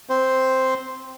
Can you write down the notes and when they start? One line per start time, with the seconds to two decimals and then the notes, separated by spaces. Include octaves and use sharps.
0.09 C4 C5